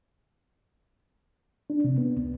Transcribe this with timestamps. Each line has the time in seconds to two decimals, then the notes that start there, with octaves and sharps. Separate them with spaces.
1.70 D4
1.84 C3
1.98 B3
2.17 C#2